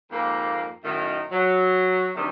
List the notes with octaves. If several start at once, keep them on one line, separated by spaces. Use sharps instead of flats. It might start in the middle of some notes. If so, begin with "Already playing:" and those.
F2 G#2 A#3
F#2 A2 D#3
F#3
D2 C3 D#3 G3